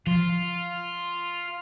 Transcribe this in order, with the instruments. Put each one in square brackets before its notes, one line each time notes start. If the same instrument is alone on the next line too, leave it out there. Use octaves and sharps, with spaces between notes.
[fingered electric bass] F3 [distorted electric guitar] F4